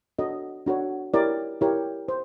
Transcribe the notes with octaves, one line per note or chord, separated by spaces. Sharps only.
D4 F#4 A4 C#5 D#5
D4 F#4 A4 C#5
E4 G4 A#4 C#5 D5
E4 G4 A#4 C#5
C5